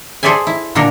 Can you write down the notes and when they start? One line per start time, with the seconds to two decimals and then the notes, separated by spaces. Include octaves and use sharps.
0.23 G#4 A4 C5 D5 E5 G#5
0.47 E4
0.75 A#2 D3 D4 A4 A#4